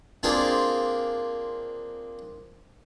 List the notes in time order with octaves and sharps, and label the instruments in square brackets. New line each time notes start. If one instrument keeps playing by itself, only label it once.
[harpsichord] A#3 C4 D4 F4 G#4 A#4